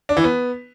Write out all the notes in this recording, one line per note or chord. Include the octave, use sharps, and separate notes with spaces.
D4
E3
B3